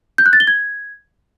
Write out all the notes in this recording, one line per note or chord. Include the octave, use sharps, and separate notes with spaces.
G6
F#6
A6
G7
G#6